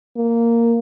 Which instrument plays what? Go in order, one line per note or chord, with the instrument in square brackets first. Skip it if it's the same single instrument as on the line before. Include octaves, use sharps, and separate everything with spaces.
[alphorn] A#3